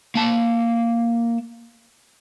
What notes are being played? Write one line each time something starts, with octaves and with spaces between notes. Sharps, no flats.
A#3 A5